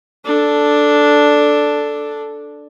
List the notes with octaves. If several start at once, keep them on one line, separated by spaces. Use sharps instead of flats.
D4 A4